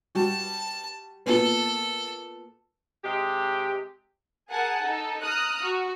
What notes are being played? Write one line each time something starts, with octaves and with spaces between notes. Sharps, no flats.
G3 F#4 A5
A#2 B3 A4
C3 G#3 G4
G#4 A#4 F#5 G#5 A5
D#4 A4
A#5 D#6 F6 F#6
F#4